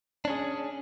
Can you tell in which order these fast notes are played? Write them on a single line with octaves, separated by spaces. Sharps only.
D4 C#4 G#4